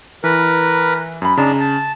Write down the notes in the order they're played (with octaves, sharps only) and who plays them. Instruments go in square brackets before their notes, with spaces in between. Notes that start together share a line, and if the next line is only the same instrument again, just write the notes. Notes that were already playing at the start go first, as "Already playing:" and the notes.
[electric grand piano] E3 [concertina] A#4 B4
[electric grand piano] F#2 B5
[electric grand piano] C#3 [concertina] D4 D#4 A5
[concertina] A5